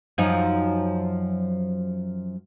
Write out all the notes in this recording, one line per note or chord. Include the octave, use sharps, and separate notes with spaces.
F#2 F3 D#4